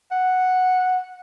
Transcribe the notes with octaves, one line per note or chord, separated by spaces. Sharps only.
F#5